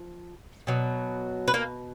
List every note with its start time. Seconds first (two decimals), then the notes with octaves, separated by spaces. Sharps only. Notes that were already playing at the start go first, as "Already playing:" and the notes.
Already playing: F3
0.67 B2 F#3
1.48 B4
1.54 A#3 A#4